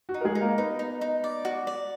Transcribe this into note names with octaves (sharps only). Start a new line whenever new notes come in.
F#4
D#4
A#4
G#3 G#4
D#4
A#3 A#4
B3 D#4 B4
D#4
D#4
D5
F#4
D5